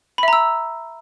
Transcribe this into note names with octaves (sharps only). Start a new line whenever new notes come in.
E5 A#5 B5 E6